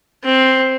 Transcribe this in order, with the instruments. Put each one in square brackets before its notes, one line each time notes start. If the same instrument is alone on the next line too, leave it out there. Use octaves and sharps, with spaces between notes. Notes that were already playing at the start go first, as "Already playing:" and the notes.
[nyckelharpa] C4